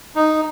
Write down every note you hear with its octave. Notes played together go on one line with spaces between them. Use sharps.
D#4